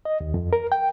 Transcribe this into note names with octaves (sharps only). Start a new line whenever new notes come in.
D#5
D#2
F2
A#4
G5